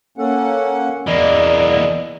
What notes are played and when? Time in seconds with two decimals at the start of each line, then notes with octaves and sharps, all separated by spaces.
0.18 A#3 C#4 A4 F#5
1.07 E2 E3 A#3 D5 D#5